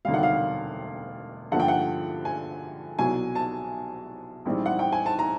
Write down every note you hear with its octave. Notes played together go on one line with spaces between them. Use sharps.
E1 D2 C3 D#3 G3 F5
F#5
F5
G2 D3 F3 A#3 F#5
G5
F#5
G#5
C2 B2 F#3 G#5
A5
A#1 G#2 E3 G3 C4
F#5
G5
G#5
A5
A#5